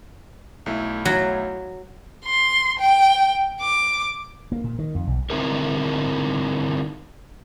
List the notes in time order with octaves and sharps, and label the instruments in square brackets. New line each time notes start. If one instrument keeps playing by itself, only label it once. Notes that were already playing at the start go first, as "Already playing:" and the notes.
[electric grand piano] B1 A3 E4
[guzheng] F#3
[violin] C6
G5
D6
[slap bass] A#3
A#2
D#3
F2
B1
[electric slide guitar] D3 C4 D#4 E4 G#4 A#4